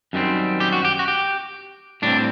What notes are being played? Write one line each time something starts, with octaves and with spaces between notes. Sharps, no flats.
F#2 D#3 G3 C4
G4
F#4
G4
F#4
G4
A2 G3 C4 D4